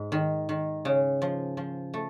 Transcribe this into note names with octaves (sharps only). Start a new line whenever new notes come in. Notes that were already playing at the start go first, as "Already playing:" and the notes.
Already playing: G#2
D#3
D#3
C#3
F3
F3
A3